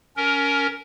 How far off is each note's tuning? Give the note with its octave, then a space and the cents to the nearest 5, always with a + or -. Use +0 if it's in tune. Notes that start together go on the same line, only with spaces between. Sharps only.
C#4 +25 A#4 +0